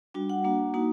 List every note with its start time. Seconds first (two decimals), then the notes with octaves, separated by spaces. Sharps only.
0.14 G3 D4 F#4 G5
0.30 F#5
0.44 A#3 D4 F#4
0.74 A#3 D#4 F#4